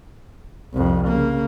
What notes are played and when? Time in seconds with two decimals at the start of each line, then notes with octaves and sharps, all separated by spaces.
0.73 C2 F2
1.07 C#3 A#3